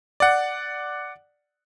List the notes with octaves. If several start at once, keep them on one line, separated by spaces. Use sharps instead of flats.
D5 F#5